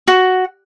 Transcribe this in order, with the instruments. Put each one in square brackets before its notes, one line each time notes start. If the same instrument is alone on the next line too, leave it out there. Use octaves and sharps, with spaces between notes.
[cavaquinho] F#4